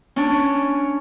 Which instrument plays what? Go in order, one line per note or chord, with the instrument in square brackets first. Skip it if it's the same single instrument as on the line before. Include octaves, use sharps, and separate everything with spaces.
[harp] C#4 D4